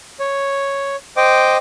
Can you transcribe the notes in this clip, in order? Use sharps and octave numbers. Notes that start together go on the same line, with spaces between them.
C#5
C5 D#5 G5 D6